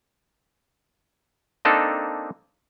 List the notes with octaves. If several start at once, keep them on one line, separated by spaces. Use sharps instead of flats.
A#3 C4 D4 D#4 A4